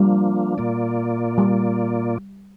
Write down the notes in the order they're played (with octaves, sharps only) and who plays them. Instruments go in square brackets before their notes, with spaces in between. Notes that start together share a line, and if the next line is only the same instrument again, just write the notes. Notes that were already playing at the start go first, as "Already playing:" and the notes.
Already playing: [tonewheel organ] F3 A#3 D4 F4 [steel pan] G3
[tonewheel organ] A#2 A#3 F4 D5
[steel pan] G3